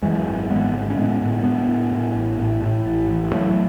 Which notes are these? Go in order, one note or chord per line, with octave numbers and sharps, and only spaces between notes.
F#2 E3 G#3
G#1
G#1 G#3 B3
D3
C#4
A2 G#3 B3
A2
A2 B3 D4
A2
A2
A1
A2
A2
A1
A1
A2 F#3 A3